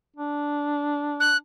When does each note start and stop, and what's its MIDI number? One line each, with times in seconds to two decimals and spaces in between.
0.16 1.37 62
1.20 1.37 90